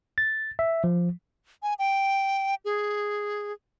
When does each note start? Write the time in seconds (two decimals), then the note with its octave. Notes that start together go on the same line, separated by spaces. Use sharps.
0.18 A6
0.59 E5
0.84 F3
1.63 G#5
1.79 G5
2.65 G#4